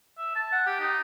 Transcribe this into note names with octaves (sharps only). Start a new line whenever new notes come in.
E5
A5
F#5
G4
D#4